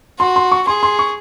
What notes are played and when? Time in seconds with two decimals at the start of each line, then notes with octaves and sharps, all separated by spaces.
0.20 F#4 C6
0.36 C6
0.51 C#6
0.67 G#4 C6
0.83 C6
0.99 C#6